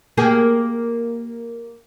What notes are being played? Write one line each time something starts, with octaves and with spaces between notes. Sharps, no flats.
A#3 G4 G#4